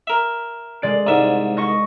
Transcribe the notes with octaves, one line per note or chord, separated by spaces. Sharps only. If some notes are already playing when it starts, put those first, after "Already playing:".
A#4 E5
G#3 D5 D7
C2 G#2 E5
D#5 C#6 A#6